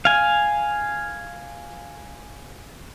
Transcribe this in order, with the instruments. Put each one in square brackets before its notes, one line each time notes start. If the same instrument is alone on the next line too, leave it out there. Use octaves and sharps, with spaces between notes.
[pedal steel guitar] F5 G#5